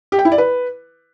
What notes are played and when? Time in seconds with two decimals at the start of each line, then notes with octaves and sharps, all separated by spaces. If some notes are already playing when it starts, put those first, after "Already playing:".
0.12 G4
0.19 G5
0.25 E4
0.32 D5
0.38 B4